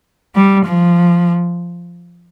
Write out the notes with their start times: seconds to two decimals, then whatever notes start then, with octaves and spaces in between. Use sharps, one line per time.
0.35 G3
0.66 F3